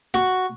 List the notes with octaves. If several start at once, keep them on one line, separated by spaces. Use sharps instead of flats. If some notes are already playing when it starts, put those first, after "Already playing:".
F#4